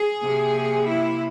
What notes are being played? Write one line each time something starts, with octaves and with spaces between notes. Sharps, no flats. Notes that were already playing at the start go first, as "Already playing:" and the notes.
Already playing: G#4
C3 F3 A#3
E4